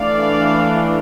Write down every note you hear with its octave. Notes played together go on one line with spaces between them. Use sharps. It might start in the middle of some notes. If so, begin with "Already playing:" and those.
Already playing: E3 A3 D4 D5 F5